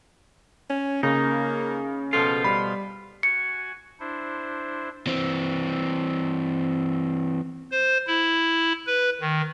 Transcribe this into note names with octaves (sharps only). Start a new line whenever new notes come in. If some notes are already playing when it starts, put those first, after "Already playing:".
C#4
C#3 A#3 D#4
B2 F3 F4 A4
G3 B5
F#4 G#5 C#7
D4 E4 C5
E3 C4
C5
E4
B4
D#3